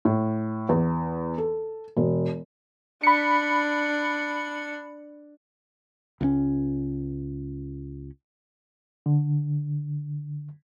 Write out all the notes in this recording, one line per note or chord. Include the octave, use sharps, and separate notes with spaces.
A2
E2
A4
E1
D4 B5 C#7
C#2 A3 C#4
D3